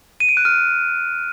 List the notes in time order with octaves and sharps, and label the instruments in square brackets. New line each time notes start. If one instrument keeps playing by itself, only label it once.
[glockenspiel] D#7
D7
F#6
F6